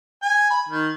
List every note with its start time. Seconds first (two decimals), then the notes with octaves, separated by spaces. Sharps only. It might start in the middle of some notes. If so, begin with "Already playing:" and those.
0.22 G#5
0.50 B5
0.69 D#3